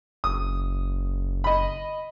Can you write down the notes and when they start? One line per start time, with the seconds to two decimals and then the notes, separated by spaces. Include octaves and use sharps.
0.24 F#1 D#6
1.44 D#5 B5